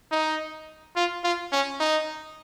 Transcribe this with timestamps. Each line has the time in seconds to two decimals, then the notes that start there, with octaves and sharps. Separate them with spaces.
0.12 D#4
0.96 F4
1.24 F4
1.53 C#4
1.80 D#4